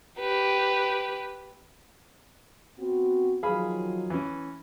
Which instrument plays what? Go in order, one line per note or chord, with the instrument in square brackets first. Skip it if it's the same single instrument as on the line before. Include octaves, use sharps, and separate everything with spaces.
[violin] G4 B4
[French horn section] B3 C4 F#4
[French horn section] D#3 F3 F#3 [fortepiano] G#4 F5 B5
[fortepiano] E3 C#4